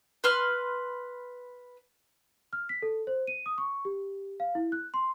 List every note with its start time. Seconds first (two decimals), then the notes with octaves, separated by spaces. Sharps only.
0.24 B4 C6 F6
2.53 F6
2.69 B6
2.82 A4
3.07 C5
3.27 D#7
3.46 D#6
3.58 C#6
3.85 G4
4.40 F5
4.55 E4
4.72 F#6
4.94 C6